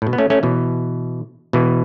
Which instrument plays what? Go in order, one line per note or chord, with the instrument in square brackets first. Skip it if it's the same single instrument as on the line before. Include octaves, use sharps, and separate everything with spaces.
[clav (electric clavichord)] A2
B2
B3
A3 C#4
A3 C#4
B2 E3
B2 E3